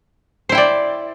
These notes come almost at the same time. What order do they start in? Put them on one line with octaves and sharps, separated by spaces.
C5 E4 G5 D5